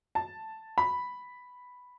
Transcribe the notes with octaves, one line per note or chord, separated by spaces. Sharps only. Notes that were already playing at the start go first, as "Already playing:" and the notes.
A5
B5